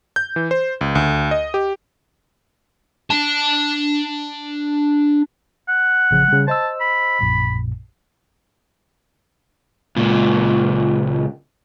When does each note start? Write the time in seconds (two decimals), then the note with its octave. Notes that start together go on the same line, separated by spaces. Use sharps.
0.16 G6
0.36 E3
0.51 C5
0.81 C#2
0.95 D2
1.31 D#5
1.54 G4
3.10 D4 A5
5.68 F#5
6.11 A1 C#3 F3
6.28 C#3 G3
6.48 C5 D#5 A5 E6
6.81 B5
7.21 A#1 F#2 A#2
9.96 C#2 A#2